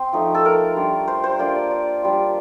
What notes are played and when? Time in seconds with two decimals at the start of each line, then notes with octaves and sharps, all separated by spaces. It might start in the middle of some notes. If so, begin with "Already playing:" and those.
Already playing: C4 C5
0.13 F3 A3 D#4
0.35 A4
0.45 A#4
0.76 G3 D4 F4
1.08 C5
1.24 C5
1.39 A#3 D4 F4 D5
1.55 D5
1.71 D5
2.03 G3 D4 F4